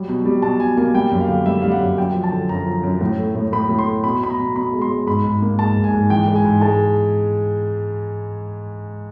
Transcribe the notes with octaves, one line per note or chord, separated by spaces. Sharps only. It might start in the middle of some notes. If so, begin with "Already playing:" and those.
Already playing: F#3 G3
B2
G3
B2 A5
B2 G#5
A#3 G#5
G3 G5
F#2
F5
D3
G3 E5
G3 F5
F#5
F#2
F#2 G5
F3
A5
D3
F#2 A#5
F3
F#2
A2
A3
A2
A2 B5
A2
C6
A3
B2 B5
B2 B5
A#5
B2
B2 B5
G#3
C6
G#3
G#2 B5
G#2
A#3
G#2 A5
G#2
G#5
G#2
E3 G5
G#3
G#5
G#2
G#3 A5